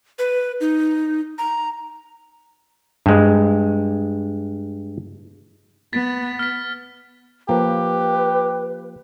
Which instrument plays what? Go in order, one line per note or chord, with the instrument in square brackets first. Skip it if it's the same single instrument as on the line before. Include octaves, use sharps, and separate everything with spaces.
[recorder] B4
D#4
A#5
[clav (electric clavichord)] G2 G#3
[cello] B3 [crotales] A6 B6
[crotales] F6 B6
[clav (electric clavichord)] F3 A#3 [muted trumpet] G4 [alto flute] B4